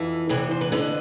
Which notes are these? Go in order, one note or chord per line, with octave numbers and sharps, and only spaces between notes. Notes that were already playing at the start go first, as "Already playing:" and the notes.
Already playing: F2 E3
E2 C3 E3 B4
C5
B4
F2 D3 B4